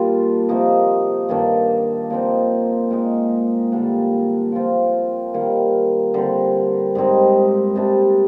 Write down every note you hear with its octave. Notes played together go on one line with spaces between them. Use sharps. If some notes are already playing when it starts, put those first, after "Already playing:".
Already playing: A#2 G3 D4 F4
C3 F3 A#3 D#4
G2 D#3 A#3 D4
A#2 F3 C4 D#4
A#2 G#3 D#4
D3 G3 A#3 D4
F3 C4 F4
D#3 G3 A#3
D3 G3 C4
G#2 G3 C4 D#4
C3 G3 D4